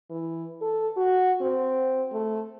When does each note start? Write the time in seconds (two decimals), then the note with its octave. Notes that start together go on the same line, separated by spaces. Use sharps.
0.11 E3
0.61 A4
0.97 F#4
1.42 C4
2.13 A3